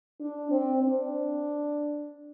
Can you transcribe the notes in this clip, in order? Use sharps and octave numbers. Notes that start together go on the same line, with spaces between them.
D4
C4
D4